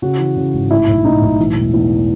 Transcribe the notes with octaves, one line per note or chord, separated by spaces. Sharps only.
C#3 F#4
E3
C#3
G#1
A2 E4
B1
A2 D#4
B1
E3
E1
E2